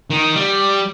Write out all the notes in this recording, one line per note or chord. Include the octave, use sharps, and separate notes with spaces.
D#3
G3